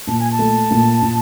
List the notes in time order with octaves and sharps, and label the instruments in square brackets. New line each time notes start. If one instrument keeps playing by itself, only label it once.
[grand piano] A#2 [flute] A5
[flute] G#5
A5
[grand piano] A3
A#2
A#2